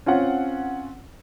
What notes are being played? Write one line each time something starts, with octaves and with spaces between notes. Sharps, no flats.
C4 C#4 F4 F#5